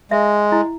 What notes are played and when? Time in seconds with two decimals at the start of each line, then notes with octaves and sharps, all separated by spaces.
0.11 G#3 E5
0.52 E4